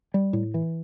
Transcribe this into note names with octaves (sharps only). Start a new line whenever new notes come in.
G3
A2
E3